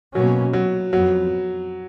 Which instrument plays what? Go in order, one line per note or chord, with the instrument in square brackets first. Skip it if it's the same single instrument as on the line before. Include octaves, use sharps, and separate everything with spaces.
[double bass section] B2 A#3 C#4 [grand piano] F#3
[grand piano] F#3
[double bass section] F2 F3 B3 [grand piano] F#3